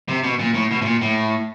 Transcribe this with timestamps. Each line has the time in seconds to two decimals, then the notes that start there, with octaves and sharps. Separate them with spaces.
0.08 C3
0.24 B2
0.40 A#2
0.54 A2
0.71 B2
0.82 A2
0.85 A#2
1.02 A2